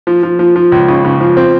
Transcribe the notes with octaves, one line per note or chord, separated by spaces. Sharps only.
F3
F3
F3
F3
C#2
C#3
C#3
F3
C4